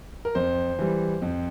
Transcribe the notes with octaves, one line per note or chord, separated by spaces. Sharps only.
A#4
F2 C5
E3 G3
F2